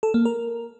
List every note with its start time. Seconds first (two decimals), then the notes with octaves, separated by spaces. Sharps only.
0.03 A4
0.14 A#3
0.25 A#4